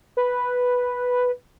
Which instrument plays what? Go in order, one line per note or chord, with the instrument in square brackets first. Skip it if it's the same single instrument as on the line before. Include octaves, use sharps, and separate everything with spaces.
[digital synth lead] B4